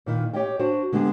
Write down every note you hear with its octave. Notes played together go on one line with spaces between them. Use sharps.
A#2 D#3 E4
G4 C#5 D#5 G5
D4 F#4 C5
D3 G#3 B3 F#4 G4